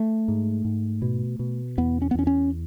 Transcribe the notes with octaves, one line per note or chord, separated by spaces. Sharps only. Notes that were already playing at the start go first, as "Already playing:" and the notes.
Already playing: A3
G#2
G#2
B2
B2
E2 B3
C#4
B3
E2 C#4
C#4